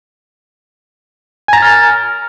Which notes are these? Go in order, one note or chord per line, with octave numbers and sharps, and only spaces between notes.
G#5 A#5 F6 A6